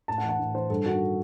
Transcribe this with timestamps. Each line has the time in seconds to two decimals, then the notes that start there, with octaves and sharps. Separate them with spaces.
0.08 A2 A5
0.18 F#5
0.23 E3
0.29 F#5
0.39 A2
0.54 E3 C5
0.70 G2 A4
0.86 D#3 F#4